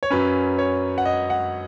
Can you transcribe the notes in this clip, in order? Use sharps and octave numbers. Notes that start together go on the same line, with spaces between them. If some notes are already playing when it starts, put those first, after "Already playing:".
C#5
F#2 F#3 C#4 B4
C#5
F#5
D#5
F#5